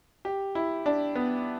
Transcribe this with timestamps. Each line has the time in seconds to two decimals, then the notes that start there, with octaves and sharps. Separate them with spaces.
0.25 G4
0.55 E4
0.86 D4
1.15 B3